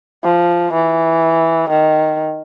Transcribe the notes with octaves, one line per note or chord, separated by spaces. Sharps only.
F3
E3
D#3